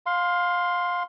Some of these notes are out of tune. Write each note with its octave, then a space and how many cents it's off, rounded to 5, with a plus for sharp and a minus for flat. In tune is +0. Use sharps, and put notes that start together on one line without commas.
F5 +20 C6 +0